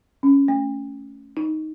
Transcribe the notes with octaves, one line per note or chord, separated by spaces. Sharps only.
C#4
A3
D#4